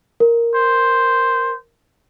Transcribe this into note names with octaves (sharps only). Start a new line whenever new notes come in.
A#4
C5